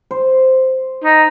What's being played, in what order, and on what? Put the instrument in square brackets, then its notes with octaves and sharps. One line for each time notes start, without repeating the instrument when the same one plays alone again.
[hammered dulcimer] C5
[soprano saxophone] D#4